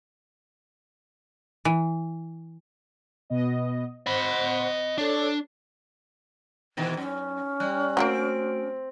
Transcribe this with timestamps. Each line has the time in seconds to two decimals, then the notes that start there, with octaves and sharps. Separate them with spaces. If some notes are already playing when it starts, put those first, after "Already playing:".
1.65 E3
3.30 B2 B3 D#5
4.06 C5 D#5 F#5 B5
4.98 D4 A4 C#5
6.77 B2 D#3 E3
6.97 F#2 C#4
7.60 G3 F#6
7.97 F#3 G3 A3 A#3 C4 F#4 D7